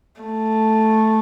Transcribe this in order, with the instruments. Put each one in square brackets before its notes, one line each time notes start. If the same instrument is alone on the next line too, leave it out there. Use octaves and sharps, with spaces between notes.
[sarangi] A3